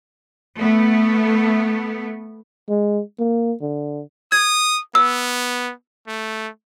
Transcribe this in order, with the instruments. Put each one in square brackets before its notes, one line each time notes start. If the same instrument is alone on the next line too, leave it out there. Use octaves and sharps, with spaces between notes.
[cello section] A3 B3
[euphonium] G#3
A#3
D3
[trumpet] D#6 [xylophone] G#6
[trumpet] B3 [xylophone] E6
[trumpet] A3